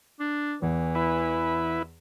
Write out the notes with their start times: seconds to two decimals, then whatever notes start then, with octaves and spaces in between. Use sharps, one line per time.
0.20 D4
0.62 E2 E3
0.95 E4 B4